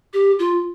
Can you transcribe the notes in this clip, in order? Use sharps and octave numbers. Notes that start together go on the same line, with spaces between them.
G4
F4